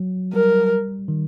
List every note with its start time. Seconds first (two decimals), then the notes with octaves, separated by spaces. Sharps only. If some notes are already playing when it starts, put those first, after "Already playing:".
Already playing: F#3
0.33 G3 A#4
1.08 D#3